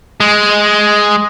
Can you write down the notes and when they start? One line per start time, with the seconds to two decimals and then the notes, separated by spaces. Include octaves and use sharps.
0.20 G#3